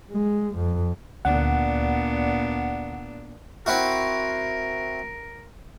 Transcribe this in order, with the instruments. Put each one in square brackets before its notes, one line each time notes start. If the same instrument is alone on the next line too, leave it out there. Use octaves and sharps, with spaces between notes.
[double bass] G#3
F2
[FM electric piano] D2 F#5 [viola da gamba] A#2 B3 D4
[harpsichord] C4 E4 F#4 [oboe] A#4